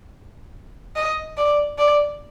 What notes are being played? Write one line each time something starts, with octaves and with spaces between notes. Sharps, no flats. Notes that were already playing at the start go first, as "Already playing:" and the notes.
D#5
D5
D5